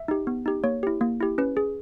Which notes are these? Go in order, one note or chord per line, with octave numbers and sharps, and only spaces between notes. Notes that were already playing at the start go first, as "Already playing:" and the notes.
Already playing: E5
D#4 G4
B3
D#4 G4
A#3 C#5
E4 G4
A#3
E4 G4
C#4 B4
G#4